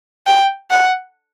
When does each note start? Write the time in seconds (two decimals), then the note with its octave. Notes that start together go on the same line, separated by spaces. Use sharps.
0.26 G5
0.70 F#5